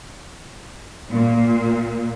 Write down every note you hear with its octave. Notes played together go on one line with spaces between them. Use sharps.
A#2